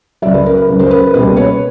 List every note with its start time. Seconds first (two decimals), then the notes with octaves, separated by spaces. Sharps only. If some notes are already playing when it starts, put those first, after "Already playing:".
0.22 C#2 C#3 F#3 D5 E5
0.34 B4
0.46 A#4
0.57 B4
0.69 C#2 C#3 F#3
0.79 A#4 C5
0.91 B4
1.02 B4
1.14 C#2 B2 G3 A#3 B4
1.37 B4 C#5